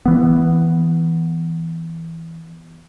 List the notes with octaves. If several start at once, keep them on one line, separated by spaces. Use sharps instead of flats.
E3 B3